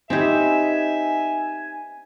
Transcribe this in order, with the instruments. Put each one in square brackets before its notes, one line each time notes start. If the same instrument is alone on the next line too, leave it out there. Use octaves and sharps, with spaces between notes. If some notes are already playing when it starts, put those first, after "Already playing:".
[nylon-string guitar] B3 D#4 [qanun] C4 G4 [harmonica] E5 [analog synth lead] G#5